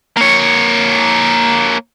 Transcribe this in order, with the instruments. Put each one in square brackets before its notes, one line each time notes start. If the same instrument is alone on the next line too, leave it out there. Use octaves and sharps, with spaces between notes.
[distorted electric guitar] A#3 C#5